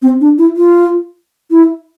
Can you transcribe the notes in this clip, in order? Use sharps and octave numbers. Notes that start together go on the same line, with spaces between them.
C4
D4
E4
F4
E4